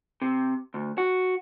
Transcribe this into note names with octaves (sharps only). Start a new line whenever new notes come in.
C3
D2
F#4